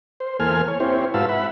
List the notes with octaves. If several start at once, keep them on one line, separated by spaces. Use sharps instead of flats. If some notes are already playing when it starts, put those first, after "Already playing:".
C5
E2 A#3 A4 C5 G#5 F6
C#5
C4 E4 G4 C5 C#5
G#2 F#4 B4 F5 A5 E6
E5 F#5 B5